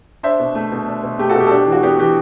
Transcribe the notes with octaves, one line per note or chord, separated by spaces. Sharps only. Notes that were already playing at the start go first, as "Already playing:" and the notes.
D4 C5 E5
B2
A3
B2
D4
B2
A3 G4
F#4 A4
B2 G4
A4
D4 G4
E3
F#4
B3 G4
E3 G4